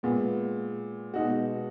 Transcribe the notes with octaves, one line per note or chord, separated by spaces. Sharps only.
A#2 G#3 B3
B2 G#3 D#4 F#4